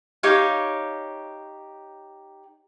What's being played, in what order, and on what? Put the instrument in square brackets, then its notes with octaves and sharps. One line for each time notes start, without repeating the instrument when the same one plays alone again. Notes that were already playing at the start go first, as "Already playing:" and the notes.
[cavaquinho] D#4 G4 C#5 F5